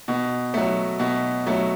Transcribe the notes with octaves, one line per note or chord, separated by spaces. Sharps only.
B2
F#3 A3
B2
F#3 A3